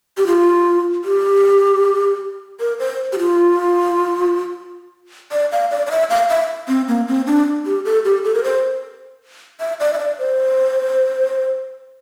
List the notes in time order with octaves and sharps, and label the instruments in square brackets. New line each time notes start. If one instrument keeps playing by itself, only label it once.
[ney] G4
F4
G4
A#4
C5
G4
F4
D5
F5
D5
D5
E5
F5
E5
C4
A#3
C4
D4
G4
A4
G4
A4
A#4
C5
E5
D5
E5
D5
C5